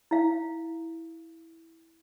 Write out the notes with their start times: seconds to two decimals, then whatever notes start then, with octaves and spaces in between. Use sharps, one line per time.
0.11 E4 F5